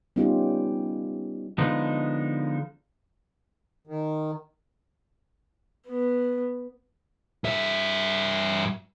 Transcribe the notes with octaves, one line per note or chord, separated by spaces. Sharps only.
G3 B3 C#4 D#4 F4 G4
D3 F3 G#3 B3 D#4
D#3
B3
G2 E5